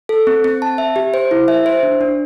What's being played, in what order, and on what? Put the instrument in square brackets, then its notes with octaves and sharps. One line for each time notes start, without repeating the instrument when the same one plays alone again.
[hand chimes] A4
C4
C4
A5
E5
G4
C5
E4
E5
C5
D4
D4